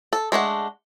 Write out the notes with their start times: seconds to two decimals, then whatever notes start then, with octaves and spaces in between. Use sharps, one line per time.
0.13 A4
0.32 G#3 A3 D4 F#5